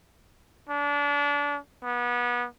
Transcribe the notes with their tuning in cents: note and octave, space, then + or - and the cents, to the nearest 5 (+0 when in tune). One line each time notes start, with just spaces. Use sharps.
D4 -30
B3 -30